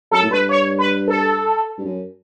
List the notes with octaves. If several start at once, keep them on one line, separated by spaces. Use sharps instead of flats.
F#2 A4
A2
G2 B4
C#5
B4
A4
G2
F#2